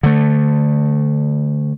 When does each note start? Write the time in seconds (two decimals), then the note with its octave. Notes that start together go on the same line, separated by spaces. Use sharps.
0.03 D3 A3